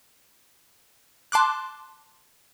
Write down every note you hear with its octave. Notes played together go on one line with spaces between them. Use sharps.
A5 C6 D6 F#6